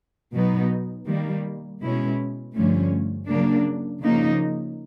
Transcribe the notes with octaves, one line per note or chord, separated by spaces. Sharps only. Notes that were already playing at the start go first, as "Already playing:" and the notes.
B2 F#3 B3 D#4
D#3 G3 A#3
B2 G#3 C#4 E4
G2 D3 F3 A3 C#4
C#3 F#3 A#3 D4
C#3 F3 A#3 D#4